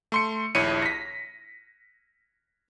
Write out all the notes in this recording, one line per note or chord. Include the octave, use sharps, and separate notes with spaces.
A3 C6 C#7
A#1 D#2 E4 C#5 C#7 D#7
A#6 B6